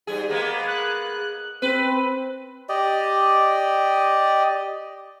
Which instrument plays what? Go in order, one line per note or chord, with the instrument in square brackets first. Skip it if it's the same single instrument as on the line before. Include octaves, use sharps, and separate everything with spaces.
[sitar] G#2 G3 G#4
G#3 A#3 B3
[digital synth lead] F#6
[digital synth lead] C4 [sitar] B4
[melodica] G4 D5 D#5